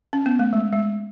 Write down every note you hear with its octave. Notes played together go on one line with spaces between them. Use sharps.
C#4
B3
A3
G#3
G#3